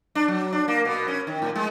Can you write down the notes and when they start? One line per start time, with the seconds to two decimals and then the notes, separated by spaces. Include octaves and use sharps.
0.15 D4
0.28 F#3
0.52 D4
0.68 A#3
0.85 B2
1.08 C#4
1.27 D#3
1.42 A2
1.55 G#3